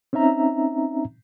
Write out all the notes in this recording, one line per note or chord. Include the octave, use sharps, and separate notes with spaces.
C4 C#4 D#4 E5 A#5